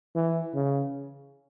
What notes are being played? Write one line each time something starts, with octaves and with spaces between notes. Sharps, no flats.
E3
C#3